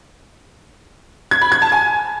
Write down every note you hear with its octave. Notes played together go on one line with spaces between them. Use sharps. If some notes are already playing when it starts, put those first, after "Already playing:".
G#6
B5
G#6
A5
G#5